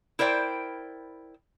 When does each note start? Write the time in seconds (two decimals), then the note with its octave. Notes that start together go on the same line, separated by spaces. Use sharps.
0.19 E4 A#4 C5 D5 G5